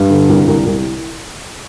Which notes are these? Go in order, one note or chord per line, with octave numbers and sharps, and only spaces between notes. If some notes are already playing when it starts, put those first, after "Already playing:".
Already playing: G2
D3
C2
C2
C2